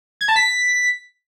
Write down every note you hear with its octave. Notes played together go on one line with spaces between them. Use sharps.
G#6
A5
B6